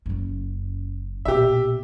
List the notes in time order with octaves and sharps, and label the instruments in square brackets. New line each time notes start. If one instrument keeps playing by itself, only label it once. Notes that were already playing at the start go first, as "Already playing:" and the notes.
[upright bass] F#1 F#2
[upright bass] A#1 B2 [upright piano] G4 E5